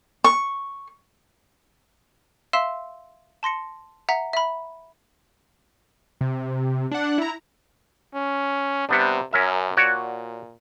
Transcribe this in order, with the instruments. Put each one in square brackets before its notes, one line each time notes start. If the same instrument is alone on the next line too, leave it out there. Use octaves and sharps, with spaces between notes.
[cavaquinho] C#6
[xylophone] E5 F5 C6 E6 E7
A5 C6 A#6 C#7
E5 F#5 A#5 B6
E5 B5
[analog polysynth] C3
D4 F#5
E4 A#5
[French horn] C#4
[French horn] C3 [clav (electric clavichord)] G3 B3 D4
[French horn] F#2 [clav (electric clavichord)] C#4 A#4 E5
[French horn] A#2 [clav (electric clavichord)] F#4 C#5 D5